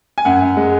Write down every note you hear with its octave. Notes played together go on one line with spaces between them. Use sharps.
G#5
F#2 F#5
F#2
G#3